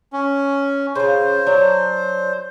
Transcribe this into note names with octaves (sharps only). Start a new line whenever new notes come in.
C#4
C#3 F3 C5
F#3 D4 D5